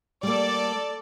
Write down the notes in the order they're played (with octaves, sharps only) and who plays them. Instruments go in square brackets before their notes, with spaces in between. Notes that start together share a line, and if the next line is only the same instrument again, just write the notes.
[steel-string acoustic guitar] G3 A#3 [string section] A4 D5